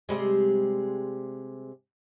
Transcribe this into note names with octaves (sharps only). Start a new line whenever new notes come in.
C3 G3 G#3